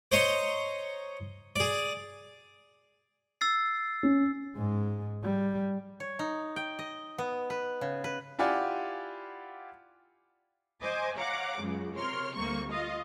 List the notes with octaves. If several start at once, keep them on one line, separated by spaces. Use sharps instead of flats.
C5 C#5 D#5 A#5 C6 C#6
G#4 D5
E6 A6 C7
C#4
G#2 G#3
G3
C#5
D#4
G5
D#5
B3
B4
C#3
B4
E4 F4 G4 D5 F#5 G#5
C5 D#5 G#5 D6
C#5 F5 F#5 A#5 D6
C#2 F#2 C#3 F#3
C3 A#4 C#5 C6 F6
D2 G3 A3 A#3 C4 C#6
F4 D#5 F5